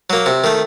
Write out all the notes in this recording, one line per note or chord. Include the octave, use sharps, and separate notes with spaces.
F#3 A#3
C3
D#3 A3